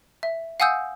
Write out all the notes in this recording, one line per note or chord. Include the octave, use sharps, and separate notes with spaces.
E5
F5 F#5 G#5 D#6 E6 G6